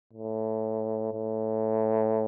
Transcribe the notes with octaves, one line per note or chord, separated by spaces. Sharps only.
A2
A2